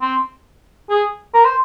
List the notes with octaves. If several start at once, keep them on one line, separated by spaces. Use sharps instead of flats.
C4
G#4
A#4
C5